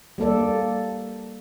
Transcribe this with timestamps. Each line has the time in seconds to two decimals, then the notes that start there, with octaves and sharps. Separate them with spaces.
0.18 G3 A#3 A4 D5